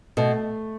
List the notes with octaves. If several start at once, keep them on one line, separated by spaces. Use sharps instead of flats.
B2 A3